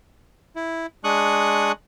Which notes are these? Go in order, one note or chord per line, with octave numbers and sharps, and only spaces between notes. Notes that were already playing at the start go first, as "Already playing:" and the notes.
E4
G#3 D4 C#6 D#6 F#6